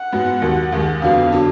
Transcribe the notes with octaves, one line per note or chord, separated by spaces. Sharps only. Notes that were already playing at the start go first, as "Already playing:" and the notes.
Already playing: F#5
G#2 F#3 B3
D#2 D#3 F#3
D#2 D#3 G#3
F2 D3 F#3 B3 F5
D3 F#3